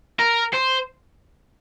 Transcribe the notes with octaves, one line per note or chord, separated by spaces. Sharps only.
A#4
C5